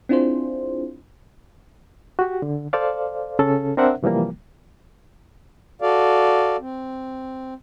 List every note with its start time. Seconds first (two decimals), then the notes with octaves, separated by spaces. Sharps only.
0.09 C4 D4 E4 F4 G#4 C5
2.19 F#4 G4
2.42 D3
2.73 A4 C5 D5 F5
3.39 C#3 C#4 A4
3.77 C4 D4 A#4 C5 E5 F#5
4.03 C3 E3 F3 G3 A#3
5.82 F#4 A4 D5 F5
6.60 C4